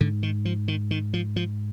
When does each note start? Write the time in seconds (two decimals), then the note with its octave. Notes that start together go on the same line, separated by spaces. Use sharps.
0.01 G#2 D3
0.23 D#3
0.45 F3
0.68 D#3
0.91 D#3
1.13 F3
1.36 F3